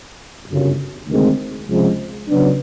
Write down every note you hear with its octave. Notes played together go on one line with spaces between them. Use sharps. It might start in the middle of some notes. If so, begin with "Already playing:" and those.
G1 F#2 C#3
D2 C3 D#3 G#3 C4
C#2 C3 F3 G#3
C#3 F#3 B3 D4